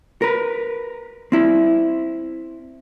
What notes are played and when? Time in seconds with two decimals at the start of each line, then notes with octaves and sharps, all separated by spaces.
0.22 A#4 B4
1.32 C4 E4